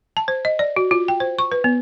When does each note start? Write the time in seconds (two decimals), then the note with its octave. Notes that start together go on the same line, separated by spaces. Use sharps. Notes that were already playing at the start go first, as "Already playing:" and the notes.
0.17 A5
0.28 C5
0.45 D#5
0.59 D5
0.76 F#4
0.91 F4
1.08 G5
1.20 C5
1.39 C#6
1.52 B4
1.64 B3